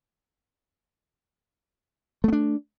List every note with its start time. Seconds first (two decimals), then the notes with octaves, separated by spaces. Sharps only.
2.24 A3
2.28 B3
2.33 D4